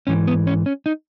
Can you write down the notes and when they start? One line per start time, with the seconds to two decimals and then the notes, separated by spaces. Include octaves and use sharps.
0.07 G#2 E3 C#4
0.27 B3
0.47 C#4
0.66 C#4
0.86 D#4